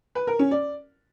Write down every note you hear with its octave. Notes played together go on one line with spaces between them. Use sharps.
B4
A#4
C#4
D5